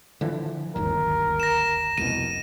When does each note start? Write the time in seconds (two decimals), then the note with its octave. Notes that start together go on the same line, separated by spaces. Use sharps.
0.21 D3 E3 F3
0.76 D1 G1 D#2 A#4
1.40 A#6 E7
1.98 F1 C2 B2 D#7